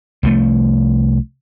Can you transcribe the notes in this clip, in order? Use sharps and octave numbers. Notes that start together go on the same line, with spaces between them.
C2 F3 A3